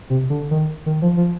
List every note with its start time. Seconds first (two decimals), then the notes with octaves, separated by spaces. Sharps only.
0.10 C3
0.30 D3
0.51 D#3
0.86 D#3
1.02 F3
1.17 F3